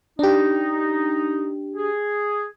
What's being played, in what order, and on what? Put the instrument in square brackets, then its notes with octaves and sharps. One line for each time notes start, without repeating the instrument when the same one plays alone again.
[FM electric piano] D4 G4 [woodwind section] D#4
[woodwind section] G#4